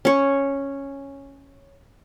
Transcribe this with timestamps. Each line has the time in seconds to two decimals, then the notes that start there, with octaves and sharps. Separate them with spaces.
0.05 C#4 C#5